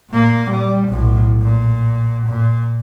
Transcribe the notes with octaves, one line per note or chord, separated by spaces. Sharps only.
A#2 A#3
G3
B1 A2
A#2
A#2